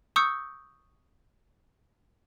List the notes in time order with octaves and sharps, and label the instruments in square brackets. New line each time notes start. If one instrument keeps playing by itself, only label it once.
[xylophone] C#6 D#6 E6 G6 C#7